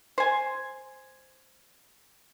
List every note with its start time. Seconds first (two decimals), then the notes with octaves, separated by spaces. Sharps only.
0.18 C5 G#5